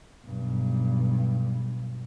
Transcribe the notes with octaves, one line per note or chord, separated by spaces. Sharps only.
B1 G2